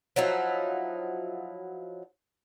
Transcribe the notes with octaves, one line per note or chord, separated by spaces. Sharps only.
F3 F#3 D#4 E4